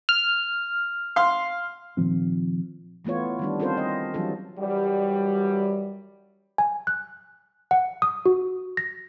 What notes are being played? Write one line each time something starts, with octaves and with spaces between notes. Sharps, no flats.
F6
F5 C6
A#2 D#3 F3 C4
E3 A3 B3 F4 C#5
D#3 G3 D4
C4 C#4 F4 A4 A#4 C5
D#5
E3 F#3 G3 D4 F4 A4
F#2 E3 F#3 G3
G#5
F#6
F#5
D#6
F#4
A#6